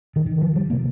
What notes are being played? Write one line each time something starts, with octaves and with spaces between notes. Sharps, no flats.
D#3
D#3
F3
G3
A#3
C3